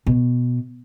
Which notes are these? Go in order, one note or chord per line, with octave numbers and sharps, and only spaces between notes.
B2